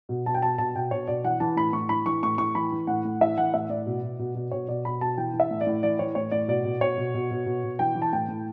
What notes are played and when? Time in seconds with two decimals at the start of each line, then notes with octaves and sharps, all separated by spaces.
0.09 B2
0.26 B2 A5
0.34 G5
0.42 B2 A5
0.58 B2 A5
0.75 B2 G5
0.91 B2 C#5
1.08 B2 D5
1.24 E3 F#5
1.40 E3 A5
1.56 A2 B5
1.73 A2 C#6
1.89 E3 B5
2.06 E3 C#6
2.23 A2 C#6
2.38 A2 C#6
2.55 E3 B5
2.72 E3
2.87 A2 F#5
3.05 A2
3.21 E3 E5
3.38 E3 F#5
3.54 A2 E5
3.69 A2 D5
3.86 B2
4.03 B2
4.19 B2
4.35 B2
4.51 B2 C#5
4.68 B2 D5
4.85 B2 B5
5.01 B2 A5
5.17 E3 G5
5.33 E3
5.40 E5
5.51 A2
5.61 D5
5.67 A2
5.83 E3 D5
5.99 E3 C#5
6.15 A2 C#5
6.31 A2 D5
6.48 B2 D5
6.65 B2
6.81 B2 C#5
6.97 B2
7.14 B2
7.31 B2
7.46 B2
7.64 B2
7.79 E3 G5
7.95 E3
8.02 A5
8.13 A2 G5
8.28 A2